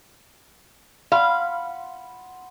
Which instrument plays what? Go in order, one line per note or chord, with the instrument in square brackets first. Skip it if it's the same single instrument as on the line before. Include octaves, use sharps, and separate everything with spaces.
[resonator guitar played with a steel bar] F5 [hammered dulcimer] F#5 B5 C6